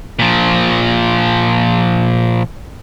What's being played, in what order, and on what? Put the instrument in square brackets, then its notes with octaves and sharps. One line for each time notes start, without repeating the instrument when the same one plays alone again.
[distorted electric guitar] A#2 F3